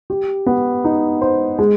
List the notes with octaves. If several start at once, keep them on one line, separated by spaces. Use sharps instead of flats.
G4
B3
D#4
C5
G#3